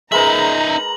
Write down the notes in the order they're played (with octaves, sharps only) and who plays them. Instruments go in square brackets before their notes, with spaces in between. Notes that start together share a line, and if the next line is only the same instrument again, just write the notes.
[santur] G#3 A#4 B4 [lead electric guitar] D#4 E5 [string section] A#5 [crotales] F#7